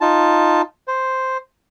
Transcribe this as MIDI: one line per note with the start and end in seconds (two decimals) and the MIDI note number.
0.01 0.62 63
0.01 0.62 65
0.01 0.62 81
0.88 1.37 72